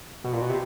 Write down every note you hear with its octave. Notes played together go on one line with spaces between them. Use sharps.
B2
A#2
B2
C3